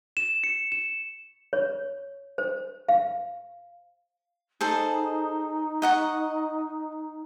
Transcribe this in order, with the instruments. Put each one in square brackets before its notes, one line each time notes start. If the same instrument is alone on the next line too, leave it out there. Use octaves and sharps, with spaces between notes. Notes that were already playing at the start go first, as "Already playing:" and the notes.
[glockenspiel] E7
C#7
E7
[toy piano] C#5
C5
F5
[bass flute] D#4 [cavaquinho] G#4 A4 C5
[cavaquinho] D#5 F#5 C#6